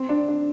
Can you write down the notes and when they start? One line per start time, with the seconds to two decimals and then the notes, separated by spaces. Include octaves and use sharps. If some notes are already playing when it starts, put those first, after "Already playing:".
Already playing: C4
0.09 D4
0.28 D4